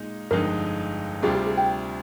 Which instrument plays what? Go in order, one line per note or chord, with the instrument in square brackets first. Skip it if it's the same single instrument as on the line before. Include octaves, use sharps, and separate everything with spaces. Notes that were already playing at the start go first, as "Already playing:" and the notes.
Already playing: [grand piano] A#2 G#3 D#4
[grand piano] G1 F2 D3 G#3 D#4 [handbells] A#4
[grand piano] D2 C3 G3 D4 F4 [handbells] G#4
[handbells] G4
G#4
G5